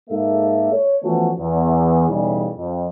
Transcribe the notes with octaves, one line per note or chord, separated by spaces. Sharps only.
G#2 A#3 A4 E5
C#5
E3 F3 A3 B3 C#4 F#4
E2
B1 E2 C#3 E3 G3
F2